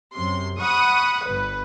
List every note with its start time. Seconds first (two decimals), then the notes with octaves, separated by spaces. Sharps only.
0.13 F#2 C3 C6
0.59 F#5 B5 C#6 D#6
1.24 G1 B4